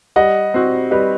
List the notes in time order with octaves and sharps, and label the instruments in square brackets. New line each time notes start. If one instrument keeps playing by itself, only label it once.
[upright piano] G3 [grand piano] D#5 F#5
[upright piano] C4 F#4
[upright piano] G3 [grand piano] B4 D#5